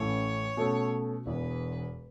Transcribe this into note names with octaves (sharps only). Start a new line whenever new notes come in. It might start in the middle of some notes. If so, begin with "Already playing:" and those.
Already playing: A1 A2 E3 A3 C#4 C#5
B2 A3 C#4 A4
E1 E2 E3 B4